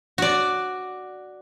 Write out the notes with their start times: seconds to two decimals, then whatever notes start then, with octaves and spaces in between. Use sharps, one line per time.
0.18 F#4 D5